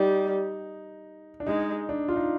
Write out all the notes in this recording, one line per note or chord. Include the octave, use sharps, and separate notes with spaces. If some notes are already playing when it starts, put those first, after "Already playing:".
Already playing: G3 D#4
D4
G#3 D#4
D4
F4
D#4